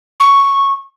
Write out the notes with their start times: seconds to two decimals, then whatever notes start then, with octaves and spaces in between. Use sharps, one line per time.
0.20 C#6